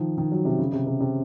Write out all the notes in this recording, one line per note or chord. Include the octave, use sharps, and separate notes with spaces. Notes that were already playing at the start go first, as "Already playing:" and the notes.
Already playing: D#3 F3
D#3
F#3
C3
C#3
C3
C3
C3